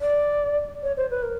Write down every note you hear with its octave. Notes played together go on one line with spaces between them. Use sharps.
D5
C#5
C5
B4
A#4